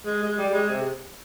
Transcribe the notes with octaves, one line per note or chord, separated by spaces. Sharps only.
G#3
G#3
G3
G#3
C3